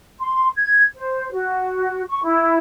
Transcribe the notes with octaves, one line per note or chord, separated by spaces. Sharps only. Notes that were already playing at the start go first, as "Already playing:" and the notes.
C6
G#6
C5
F#4
C#6
E4